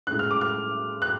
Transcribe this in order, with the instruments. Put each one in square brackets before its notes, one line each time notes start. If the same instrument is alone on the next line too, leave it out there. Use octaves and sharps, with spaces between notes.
[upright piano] A2 G#3 C#4 F#6
F6
D6
F6
F#6